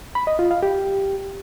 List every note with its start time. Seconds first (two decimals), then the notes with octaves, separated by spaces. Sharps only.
0.15 B5
0.27 D#5
0.39 F4
0.51 F5
0.63 G4